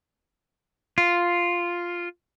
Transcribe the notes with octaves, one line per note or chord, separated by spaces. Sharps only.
F4